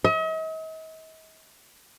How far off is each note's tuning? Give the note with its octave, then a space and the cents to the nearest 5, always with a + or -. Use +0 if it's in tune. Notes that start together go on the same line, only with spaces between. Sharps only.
D#5 +45